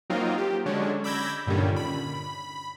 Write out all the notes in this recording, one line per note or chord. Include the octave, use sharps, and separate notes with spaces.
F#3 A#3 C4 D#4 F4 A#4
G4
D3 F#3 G#3 C#4 D4
B5 D6 E6 G6 G#6 A#6
G2 A#2 D3 D#3 G3 C#4
B5